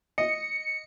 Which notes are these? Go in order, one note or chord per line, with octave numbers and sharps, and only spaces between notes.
D#5 C#7